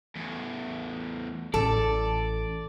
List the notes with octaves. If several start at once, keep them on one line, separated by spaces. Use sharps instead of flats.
E2 A2
A1 A4 D5